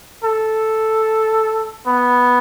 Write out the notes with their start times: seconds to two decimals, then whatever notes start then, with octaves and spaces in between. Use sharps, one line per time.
0.24 A4
1.87 B3